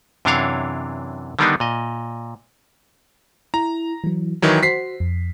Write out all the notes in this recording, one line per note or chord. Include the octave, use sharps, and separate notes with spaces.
F#2 C3 E3 D4 C#5 F5
D3 D#3 G3 B3 D4 D#4
A#2 D#5
E4 A#5
E3 F#3
D#3 E3 F#3 A#5
F#4 C5 B6 C7
F2